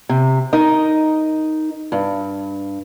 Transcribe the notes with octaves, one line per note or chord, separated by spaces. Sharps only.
C3
D#4 A#4 D#5
G2